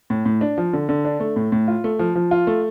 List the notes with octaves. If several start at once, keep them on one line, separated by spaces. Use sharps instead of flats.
A2
A2
D4
F3
D3
D3
D4
A3
A2
A2
F4
A3
F3
F3
F4
A3